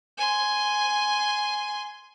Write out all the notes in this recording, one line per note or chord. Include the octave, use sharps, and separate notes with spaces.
G#5 C6